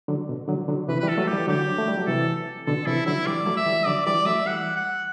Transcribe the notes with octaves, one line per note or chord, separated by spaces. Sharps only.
D3 F#3
B2
D3 F#3
D3 F#3
C3 E3 B4
E3 G3 B4
A4
F#3 A3
E3 G3 G4
D3 F#3 G4
A3
G3
F#3
C3 E3 A4
B2 D3 A4
C3 E3 E4
D3 F#3 E4
E3 G3 D5
F#3 A3
E5
E3 G3
D3 F#3 D5
E3 G3 D5
F#3 A3 E5
E3 G3 F#5
F#5